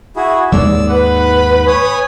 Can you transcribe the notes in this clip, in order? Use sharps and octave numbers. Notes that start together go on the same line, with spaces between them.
E4 F#4 G#4
D#2 G#2 G#3 D5 E6
B4 F#5 B5
C#5 G#5 D#6